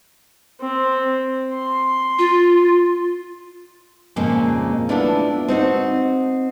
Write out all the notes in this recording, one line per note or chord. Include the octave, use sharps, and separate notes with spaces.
C4
C6
F4
F2 A#2 C#3 G#3 A#3
A3 B3 D4 E4 F4
C4 D#4 F#4